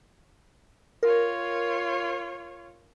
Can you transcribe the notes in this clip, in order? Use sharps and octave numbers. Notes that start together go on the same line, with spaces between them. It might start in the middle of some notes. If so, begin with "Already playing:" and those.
F4 A#4 C#5